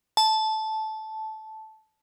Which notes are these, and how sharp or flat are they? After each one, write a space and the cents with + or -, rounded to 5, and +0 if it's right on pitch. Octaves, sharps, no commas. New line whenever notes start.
A5 -10